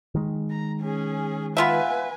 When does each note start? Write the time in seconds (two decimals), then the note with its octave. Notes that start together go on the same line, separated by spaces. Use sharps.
0.15 D#3 G#3
0.50 A#5
0.82 C#4 G#4
1.57 B3 F4 B4 E5 G#5